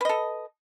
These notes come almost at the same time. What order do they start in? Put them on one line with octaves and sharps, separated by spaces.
B4 D#5 A4